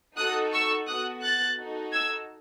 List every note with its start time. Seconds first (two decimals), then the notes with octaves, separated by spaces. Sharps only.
0.17 D#4 F#4 A4 D#6 F#6
0.52 C#6 E6
0.87 B3 F#4 A4 D#6 F#6
1.23 F#6 A6
1.58 D#4 F#4 A4
1.93 E6 G#6